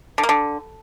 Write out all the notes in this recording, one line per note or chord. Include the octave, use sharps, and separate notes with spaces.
D3
A#3
D3